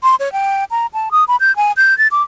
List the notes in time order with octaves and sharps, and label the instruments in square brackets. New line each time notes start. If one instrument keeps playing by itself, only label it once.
[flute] C6
C#5
G5
A#5
A5
D#6
B5
G6
G#5
G6
A6
D6